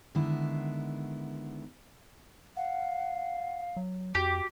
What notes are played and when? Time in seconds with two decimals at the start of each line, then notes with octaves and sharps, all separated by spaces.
0.15 D3 D#3 G#3 B3 E4
2.56 F5 F#5
3.77 F#3
4.15 F2 F#4 G4 D6